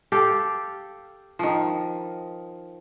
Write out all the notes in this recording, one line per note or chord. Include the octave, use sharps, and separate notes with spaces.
G4 A4 F5
D#3 F3